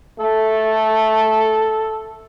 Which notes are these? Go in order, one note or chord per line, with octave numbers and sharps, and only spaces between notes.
A3 A4